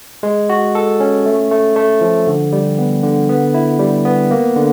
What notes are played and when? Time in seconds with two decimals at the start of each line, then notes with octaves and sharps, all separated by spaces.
0.23 G#3
0.49 F#4
0.75 A4
1.00 C#4
1.26 A3
1.51 A3
1.76 A3
2.01 F3
2.27 D3
2.52 G3
2.78 B3
3.03 D3
3.29 B3
3.54 E4
3.79 G3
4.05 B3
4.31 A#3
4.56 D3